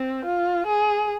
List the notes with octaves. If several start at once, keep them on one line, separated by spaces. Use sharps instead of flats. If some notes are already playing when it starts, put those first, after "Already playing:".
Already playing: C4
F4
G#4